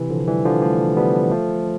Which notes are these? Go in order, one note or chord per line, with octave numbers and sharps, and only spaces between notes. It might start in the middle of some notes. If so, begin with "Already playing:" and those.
Already playing: C3 E3
D3 F3
E3 G3
D3 F3
F3 A3
G3 B3
F3 A3